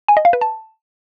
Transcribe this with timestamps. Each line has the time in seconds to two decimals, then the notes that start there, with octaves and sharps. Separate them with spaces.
0.08 G#5
0.17 D#5
0.25 F5
0.33 B4
0.41 A5